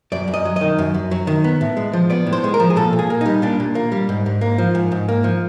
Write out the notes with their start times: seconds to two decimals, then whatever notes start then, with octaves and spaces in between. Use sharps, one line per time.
0.12 F#2 D5
0.28 F#2
0.34 D#5
0.45 F#3
0.56 D#3 D#5
0.78 F#2
0.94 F#2
1.11 F#3
1.27 D#3
1.44 B3
1.61 A2
1.77 G#3
1.93 F3
2.10 B3 D5
2.27 A2
2.33 C5
2.44 G#3
2.54 A#4
2.60 F3
2.70 G#4
2.76 A#2 A4
2.93 A#2
2.99 G#4
3.10 A#3
3.21 G3 D#4
3.42 A#2 D4
3.60 A#2
3.75 A#3
3.92 G3
4.09 G#2
4.26 G#2
4.41 A#3
4.58 F3
4.75 G#2
4.92 G#2
5.08 A#3
5.24 F3